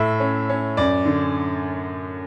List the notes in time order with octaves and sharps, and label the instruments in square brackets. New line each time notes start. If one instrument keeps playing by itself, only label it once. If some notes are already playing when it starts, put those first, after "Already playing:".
Already playing: [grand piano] A2 E5
C#4
C#4
F#2 D5
D3